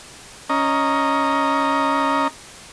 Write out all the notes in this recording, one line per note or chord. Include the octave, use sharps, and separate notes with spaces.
C#4 D#5 A#5